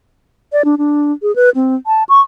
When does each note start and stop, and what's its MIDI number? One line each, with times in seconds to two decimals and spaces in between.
0.52 0.62 74
0.65 0.75 62
0.78 1.12 62
1.22 1.34 68
1.36 1.50 71
1.55 1.75 60
1.87 2.04 81
2.09 2.21 85